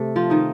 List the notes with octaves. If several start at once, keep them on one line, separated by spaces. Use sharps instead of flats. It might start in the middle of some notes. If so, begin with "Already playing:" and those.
Already playing: C3 A3
F3 F4
D#3 D#4